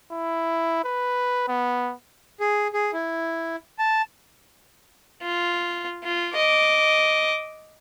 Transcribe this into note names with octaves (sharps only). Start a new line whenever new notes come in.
E4
B4
B3
G#4
G#4
E4
A5
F4
F4
D#5 D6